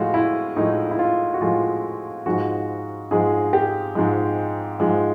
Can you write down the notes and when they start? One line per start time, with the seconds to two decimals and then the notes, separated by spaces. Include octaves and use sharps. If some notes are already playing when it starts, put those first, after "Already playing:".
Already playing: A2 F3 G#3 F4 F#4
0.14 E4
0.56 A2 F3 G#3 D#4
0.91 E4
0.99 F4
1.34 F#4
1.41 A2 F3 G#3 F4
2.26 G#2 F3 G#3 F#4
3.11 G#2 F3 G#3 G#4
3.53 G4
3.95 G#2 F3 G#3
4.80 G#2 F3 G#3